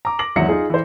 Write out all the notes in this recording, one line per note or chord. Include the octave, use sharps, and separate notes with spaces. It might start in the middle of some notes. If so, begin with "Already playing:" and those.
A#5 D6
D6 A#6 F#7
G#1 E2 F#3 E5 A#6 C#7
D#4 F4 G#4
E3 C5